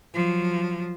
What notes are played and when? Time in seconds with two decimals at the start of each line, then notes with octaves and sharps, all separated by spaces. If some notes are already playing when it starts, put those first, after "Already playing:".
0.14 F3 F#3